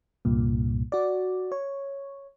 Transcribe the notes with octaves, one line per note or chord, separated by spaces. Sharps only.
C2 G2 A#2
F#4 D5
C#5